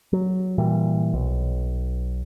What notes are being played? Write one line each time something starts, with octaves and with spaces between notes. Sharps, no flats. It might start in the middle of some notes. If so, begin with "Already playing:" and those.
F#3
A#2 E3 G3
B1